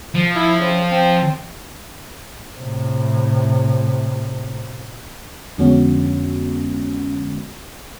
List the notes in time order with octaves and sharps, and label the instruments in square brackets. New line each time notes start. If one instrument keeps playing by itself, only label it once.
[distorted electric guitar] F3
[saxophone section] E4
C#3 C4
C4
[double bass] A2 C3
[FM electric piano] F2 D3 G#3 B3 C#4 F#4